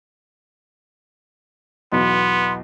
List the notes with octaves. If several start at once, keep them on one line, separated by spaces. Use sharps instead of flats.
B1 E2 B3 C6